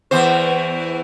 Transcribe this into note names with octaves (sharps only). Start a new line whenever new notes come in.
E2 E3 C5